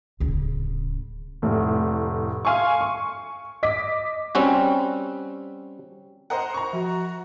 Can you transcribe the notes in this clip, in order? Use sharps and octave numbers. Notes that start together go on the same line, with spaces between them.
D1 C#3
F1 A2
F5 G#5 C6 C#6
C#6
D#5 D6 B6
G3 C4 C#4 F#4
A#4 C5 D#5 F#5
A#5 C#6
F3 F#4